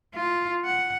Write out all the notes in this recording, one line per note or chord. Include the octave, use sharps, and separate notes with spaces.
F4
F#5